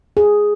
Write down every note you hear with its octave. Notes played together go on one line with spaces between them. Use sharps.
G#4